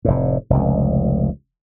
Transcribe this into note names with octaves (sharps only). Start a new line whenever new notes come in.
F1 A2
F1 C#2